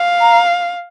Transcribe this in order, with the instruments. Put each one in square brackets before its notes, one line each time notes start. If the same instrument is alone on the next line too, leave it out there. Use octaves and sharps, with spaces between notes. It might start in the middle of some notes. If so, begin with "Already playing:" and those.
Already playing: [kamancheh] F5
[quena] A#5